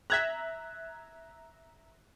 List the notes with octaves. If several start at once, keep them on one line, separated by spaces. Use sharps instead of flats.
E5 A#5 F#6 G#6 B6